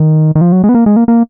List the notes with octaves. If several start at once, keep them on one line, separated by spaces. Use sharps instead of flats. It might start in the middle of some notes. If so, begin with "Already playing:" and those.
Already playing: D#3
D#3
F3
F#3
G#3
B3
A#3
G#3
A#3
A#3